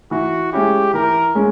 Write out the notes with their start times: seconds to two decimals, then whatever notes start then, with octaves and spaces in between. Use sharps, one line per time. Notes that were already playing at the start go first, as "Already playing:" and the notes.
0.11 E3 F#4
0.53 G#3 C#4 E4 G4
0.94 E3 A#4
1.35 G#3 C#4